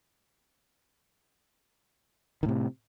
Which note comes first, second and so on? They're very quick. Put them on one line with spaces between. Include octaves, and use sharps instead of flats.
D#3 A2 C3